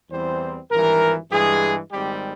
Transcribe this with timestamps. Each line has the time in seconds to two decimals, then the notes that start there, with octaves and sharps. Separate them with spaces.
0.10 E2 E3 G3 C4 C5
0.70 G#1 G2 E3 A#4
1.31 G2 E3 G#3 G#4
1.92 G#1 G#2 G3 C4 G4